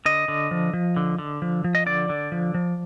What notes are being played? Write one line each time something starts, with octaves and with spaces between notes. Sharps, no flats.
D3 D#5
D3
F3
F3
D3
D3
F3
F3
D#5
D3 D5
D3
F3
F3